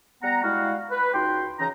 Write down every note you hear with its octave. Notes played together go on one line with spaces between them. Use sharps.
G3 B3 F#5 A#5
G3 G#3 E4 F#4 F5
B4
C#2 D#4 F#4 G5 C6
C#3 E3 C#4 D#4 A#5